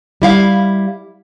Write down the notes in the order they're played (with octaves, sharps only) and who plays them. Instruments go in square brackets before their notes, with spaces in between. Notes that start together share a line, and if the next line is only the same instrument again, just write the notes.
[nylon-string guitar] G3 E4 F5